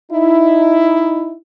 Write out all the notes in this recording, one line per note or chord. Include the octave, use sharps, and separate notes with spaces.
D#4 E4